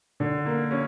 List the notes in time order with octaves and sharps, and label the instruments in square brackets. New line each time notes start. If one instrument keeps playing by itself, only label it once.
[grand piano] D3
A#3
C#4